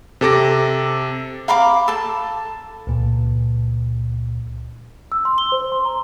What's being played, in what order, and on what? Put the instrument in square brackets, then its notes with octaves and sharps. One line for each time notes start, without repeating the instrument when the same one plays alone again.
[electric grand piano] C3 A4 D6 A#6
[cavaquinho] F5 A#5 B5 D6
A4 A5
[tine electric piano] C#2 A#2
[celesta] E6
C6
G7
C5
C6
A#5